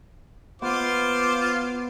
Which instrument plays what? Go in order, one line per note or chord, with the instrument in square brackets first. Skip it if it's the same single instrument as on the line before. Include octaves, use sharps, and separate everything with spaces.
[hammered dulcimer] B3 [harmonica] F4 C5 D6